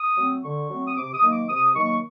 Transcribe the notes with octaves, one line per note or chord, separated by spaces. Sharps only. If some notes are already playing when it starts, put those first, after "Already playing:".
Already playing: D#6
F#3 A3 C4
D3 C#6
F#3 A3 C4
D#6
C3 D6
D#6
D#3 F#3 A#3
D6
C3 D#6
D#3 F#3 A#3 C#6